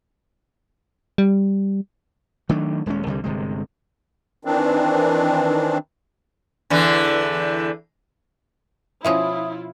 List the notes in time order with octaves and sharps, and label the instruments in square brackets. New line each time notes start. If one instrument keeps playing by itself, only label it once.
[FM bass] G3
[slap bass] D#3 F#3 A3 D4
D#1 G#3 A#3 C#4
C2 D3 F#3 G3
G1 C3 G#3
[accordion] D#3 E3 C4 D4
[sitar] E2 D3 E3
[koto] B2 F3 C#4 [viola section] E4 F4 [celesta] E5 D#6